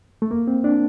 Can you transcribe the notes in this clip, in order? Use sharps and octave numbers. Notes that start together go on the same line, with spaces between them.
A3
A#3
C4
D4